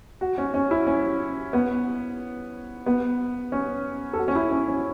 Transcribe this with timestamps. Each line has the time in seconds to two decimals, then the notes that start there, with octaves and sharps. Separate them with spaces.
0.21 F#4
0.38 C#4
0.54 C#4
0.71 E4
0.87 C#4
1.53 B3
2.86 B3
3.52 C#4
4.13 A4
4.18 F#4
4.28 C#4
4.36 E4
4.52 C#4
4.68 C#4